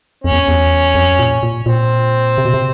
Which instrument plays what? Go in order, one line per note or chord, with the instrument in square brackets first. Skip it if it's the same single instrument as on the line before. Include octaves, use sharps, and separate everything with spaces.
[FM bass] F2 [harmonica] C#4
[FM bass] E2
E2
F2
A#2
A#2
[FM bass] A#2 [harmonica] C4
[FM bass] C3
B2
C3